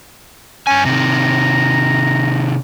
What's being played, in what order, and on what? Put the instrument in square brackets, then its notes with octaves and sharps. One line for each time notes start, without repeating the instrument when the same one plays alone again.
[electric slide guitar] G2 G#5 [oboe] C#4
[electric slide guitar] C3 D#3 [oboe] A#5